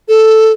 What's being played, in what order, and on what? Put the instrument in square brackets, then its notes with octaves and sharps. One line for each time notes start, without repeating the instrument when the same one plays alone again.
[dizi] A4